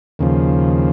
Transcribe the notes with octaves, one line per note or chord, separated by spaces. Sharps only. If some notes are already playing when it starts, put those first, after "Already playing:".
D#2 C#3 F3